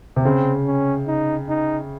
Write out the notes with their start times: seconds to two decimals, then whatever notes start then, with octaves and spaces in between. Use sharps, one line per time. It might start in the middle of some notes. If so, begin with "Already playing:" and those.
0.16 C3
0.24 C#3 C4
0.67 C#4
1.07 D#4
1.49 D#4